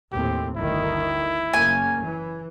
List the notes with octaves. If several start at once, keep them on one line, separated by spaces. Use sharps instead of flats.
D#2 A2 C4 G4
G1 D2 D#3 E4
F#1 A#3 C#4 G#5
E3